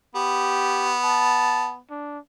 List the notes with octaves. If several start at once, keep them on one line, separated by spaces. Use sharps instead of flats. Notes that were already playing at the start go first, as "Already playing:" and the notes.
B3 G4
A5
D4